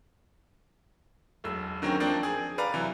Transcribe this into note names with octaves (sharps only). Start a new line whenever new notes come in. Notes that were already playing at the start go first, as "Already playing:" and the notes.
E1 B1 E6
D3 D#3 F#3 C4 C#4
F3 A#3 C4 D4
G#4
B4 D5 F5 A#5
C3 E3 F#3